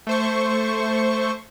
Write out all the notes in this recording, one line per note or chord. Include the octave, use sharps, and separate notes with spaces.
A3 C5 C#6